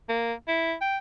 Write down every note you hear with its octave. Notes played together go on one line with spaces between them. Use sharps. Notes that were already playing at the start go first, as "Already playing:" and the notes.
A#3
E4
G5